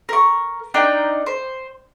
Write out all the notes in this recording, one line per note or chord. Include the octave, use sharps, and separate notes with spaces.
A#4 C#6
D4 D#4 A#4 G5
C5